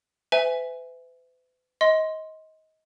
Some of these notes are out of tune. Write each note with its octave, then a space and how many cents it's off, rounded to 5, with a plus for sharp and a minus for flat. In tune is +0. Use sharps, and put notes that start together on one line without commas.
B4 +40 E5 +0 G#5 +0
D#5 +25 C6 +0